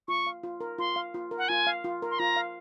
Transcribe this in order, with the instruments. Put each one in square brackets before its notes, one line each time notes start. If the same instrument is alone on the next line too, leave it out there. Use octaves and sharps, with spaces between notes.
[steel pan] F4 [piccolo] C#6
[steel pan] F5
F4
A#4
[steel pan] F4 [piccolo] C6
[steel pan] F5
F4
A#4
[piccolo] F#5
[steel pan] F4 [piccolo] G#5
[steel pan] F5
F4
A#4
[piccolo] C6
[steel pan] F4 [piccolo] A#5
[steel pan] F5